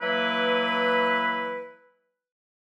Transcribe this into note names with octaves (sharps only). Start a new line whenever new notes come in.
E3 F#3 A#3 E4 B4